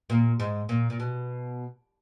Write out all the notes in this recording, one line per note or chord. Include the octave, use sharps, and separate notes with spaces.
A#2
G#2
A#2
A#2
B2